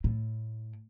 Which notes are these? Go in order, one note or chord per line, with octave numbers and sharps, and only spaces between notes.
A2